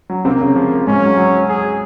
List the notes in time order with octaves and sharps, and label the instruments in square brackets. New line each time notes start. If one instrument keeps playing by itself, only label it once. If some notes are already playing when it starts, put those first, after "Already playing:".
[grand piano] F#3
[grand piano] C3 C4 [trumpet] A#3
[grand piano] C#3 C#4
F3
[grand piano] G#2 G#3 [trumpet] C#4
[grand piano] F#3
F#3
[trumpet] G#4